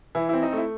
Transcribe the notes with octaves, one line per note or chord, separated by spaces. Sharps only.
E3 E4
C4 E4
D#4
A3 E4